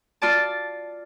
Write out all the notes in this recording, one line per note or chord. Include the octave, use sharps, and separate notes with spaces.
F4 D5 A5